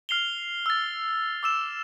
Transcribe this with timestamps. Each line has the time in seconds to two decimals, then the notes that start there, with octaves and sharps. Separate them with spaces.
0.09 F6 C7 F7 G7
0.66 E6 A6
1.43 D6 E6 E7